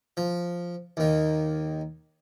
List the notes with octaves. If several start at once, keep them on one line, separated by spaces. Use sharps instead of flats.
F3
D#2 D#3